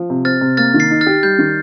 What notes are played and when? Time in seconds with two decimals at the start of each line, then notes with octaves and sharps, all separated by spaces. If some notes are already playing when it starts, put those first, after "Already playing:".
Already playing: F3
0.10 C3
0.25 C4 F6 A6
0.41 C3
0.57 A#3 F6 A6
0.74 D#3
0.80 A6 C7
0.90 D#4
1.01 F6 A6
1.06 G4
1.23 G3 G6
1.38 D#3